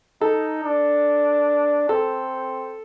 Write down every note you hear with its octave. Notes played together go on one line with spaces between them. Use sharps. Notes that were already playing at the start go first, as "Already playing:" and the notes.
D#4 A4
D4
C4 A4